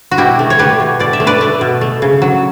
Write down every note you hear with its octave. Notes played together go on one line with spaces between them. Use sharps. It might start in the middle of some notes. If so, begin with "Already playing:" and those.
F#4
B2 E4 G4
A3
C#5
A3 G4 B4
B2
B2 D5
E5
A3
B4 D5
A3
B2
A3
C#3
F#3